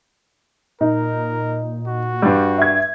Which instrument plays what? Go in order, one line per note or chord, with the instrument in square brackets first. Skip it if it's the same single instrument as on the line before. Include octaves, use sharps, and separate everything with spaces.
[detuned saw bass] A#2 [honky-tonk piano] D#4 [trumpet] A#4
[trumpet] F#4
[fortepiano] G2 G3
[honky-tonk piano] E5 G#6